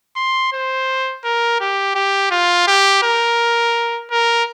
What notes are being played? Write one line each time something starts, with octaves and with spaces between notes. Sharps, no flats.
C6
C5
A#4
G4
G4
F4
G4
A#4
A#4